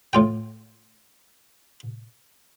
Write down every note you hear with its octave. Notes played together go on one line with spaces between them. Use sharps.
A2 F4 G5